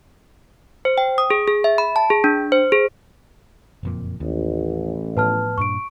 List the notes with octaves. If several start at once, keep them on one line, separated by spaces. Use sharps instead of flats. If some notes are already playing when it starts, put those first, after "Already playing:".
C5
G5
D#6
G#4
G#4
E5
B5
A5
G#4
D4
C5
G#4
F#1 F2 A#2
A1 D#2
A2 F3 B3 B4 A5 F6
G2 A#2 D4 C#6 D7